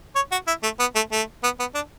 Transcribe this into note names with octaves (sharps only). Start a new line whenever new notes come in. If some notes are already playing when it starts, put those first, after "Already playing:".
C#5
F#4
E4
A3
B3
A3
A3
B3
B3
D4